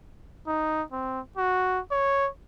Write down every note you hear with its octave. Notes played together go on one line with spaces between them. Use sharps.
D#4
C4
F#4
C#5